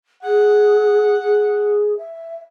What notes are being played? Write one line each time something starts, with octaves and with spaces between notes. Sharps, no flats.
G#4 F#5
G#4
E5